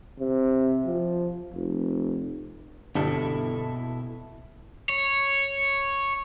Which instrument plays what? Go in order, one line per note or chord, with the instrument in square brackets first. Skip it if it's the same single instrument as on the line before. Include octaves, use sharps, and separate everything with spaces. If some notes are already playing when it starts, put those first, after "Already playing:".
[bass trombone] C3
F3
F1
[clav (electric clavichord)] G1 [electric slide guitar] B2 E4 A4
[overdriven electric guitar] C#5